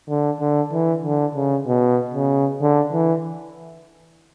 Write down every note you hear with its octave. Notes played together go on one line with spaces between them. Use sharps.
D3
D3
E3
D3
C#3
B2
C#3
D3
E3